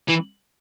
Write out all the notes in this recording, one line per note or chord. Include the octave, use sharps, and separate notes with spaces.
E3